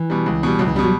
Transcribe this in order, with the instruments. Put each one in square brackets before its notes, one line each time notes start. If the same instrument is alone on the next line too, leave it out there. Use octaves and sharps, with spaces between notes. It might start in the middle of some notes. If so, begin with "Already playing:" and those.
Already playing: [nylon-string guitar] E3
[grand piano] B2 G3
C#2
B2 G3
[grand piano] C#2 [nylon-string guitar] F#3
[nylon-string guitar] E3
[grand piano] B2 G3 [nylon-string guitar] D3
[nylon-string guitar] F#3